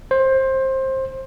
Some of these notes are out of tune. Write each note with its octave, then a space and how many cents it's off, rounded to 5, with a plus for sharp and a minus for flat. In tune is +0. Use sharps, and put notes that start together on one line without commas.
C5 +20